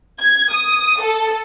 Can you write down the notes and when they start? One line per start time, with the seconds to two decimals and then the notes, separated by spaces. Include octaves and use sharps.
0.20 G#6
0.52 D#6
1.02 A4